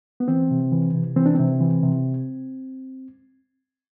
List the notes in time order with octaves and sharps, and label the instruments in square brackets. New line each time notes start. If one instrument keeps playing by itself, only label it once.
[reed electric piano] B3
E3 C4
C3
E3
C3
E3 C4
D4
C3 C4
E3
C3